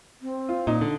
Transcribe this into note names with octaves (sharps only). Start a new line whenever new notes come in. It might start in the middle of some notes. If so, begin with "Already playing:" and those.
C4
F4
A#2 D#4
D3